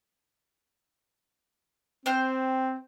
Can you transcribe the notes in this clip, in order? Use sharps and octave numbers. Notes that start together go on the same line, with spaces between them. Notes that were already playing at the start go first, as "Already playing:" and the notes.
C4 C5 G5 F6